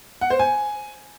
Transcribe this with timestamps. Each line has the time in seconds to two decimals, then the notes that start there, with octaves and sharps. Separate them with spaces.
0.21 F#5
0.30 C5
0.39 G#5